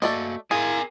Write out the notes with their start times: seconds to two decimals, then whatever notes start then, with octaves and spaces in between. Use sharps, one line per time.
0.02 A3 A#3 F#4 D5 D#5
0.51 E4 G#4 A#4 F5 G#5